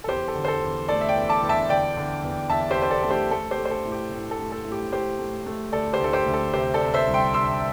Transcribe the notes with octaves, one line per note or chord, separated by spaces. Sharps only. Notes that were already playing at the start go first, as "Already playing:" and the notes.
A4
E2 G4 C5
A4
D3
C5
A4
E2
A3 A4 D5
E5
D5 G5
E2
A5 D6
E2
E5 A5
D3 D5 G5
D3
E2
E2 E5 A5
G4 C5
E2
C5
A4 D5
A3 A4
G4 C5
A3 A4
G4 C5
A3
C5
A4
A2
G4
A2
A4
A3
A4
A2
G4
A3 G4 C5
A3
A3
D2 A4 D5
G4 C5
D2 A4
G4 C5
D2
A4
C3 G4 C5
A4 D5
C3
C5 E5
C2
G5 C6
C3 C6 E6